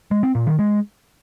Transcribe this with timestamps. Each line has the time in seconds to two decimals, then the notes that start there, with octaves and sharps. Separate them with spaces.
0.11 G#3
0.23 C4
0.35 A#2
0.47 D#3
0.59 G#3